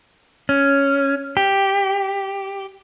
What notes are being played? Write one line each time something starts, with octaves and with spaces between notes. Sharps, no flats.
C#4
G4